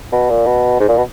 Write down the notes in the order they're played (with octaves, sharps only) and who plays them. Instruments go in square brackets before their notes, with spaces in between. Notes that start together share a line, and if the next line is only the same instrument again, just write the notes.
[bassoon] B2
A#2
B2
G#2
A#2
B2